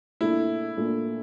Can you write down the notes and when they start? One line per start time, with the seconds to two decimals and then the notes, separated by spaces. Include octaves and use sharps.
0.21 A#2 A3 D4 E4
0.77 A#2 A3 D4